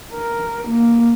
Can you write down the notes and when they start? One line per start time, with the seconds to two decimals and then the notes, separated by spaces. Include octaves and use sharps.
0.13 A#4
0.67 A#3